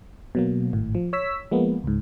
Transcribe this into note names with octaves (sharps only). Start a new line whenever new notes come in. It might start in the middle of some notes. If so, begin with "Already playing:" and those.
B2 F#3 A#3
G#1 A2
F3
C#5 E6 B6
F3 G#3 A#3 B3
C#2 G#2